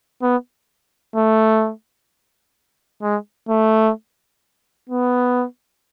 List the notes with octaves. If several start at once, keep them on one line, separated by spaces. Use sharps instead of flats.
B3
A3
G#3
A3
B3